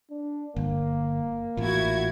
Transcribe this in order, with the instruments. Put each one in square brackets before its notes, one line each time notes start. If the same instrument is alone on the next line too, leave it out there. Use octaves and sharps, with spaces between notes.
[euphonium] D4
[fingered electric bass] G1 [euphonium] A#3
[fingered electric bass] A1 A#2 [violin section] E4 F#4 G#6